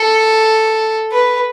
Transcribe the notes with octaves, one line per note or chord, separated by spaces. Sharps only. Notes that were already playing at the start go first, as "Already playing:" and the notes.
Already playing: A4
B4